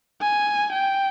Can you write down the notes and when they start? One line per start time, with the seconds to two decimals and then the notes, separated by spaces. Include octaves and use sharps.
0.22 G#5
0.72 G5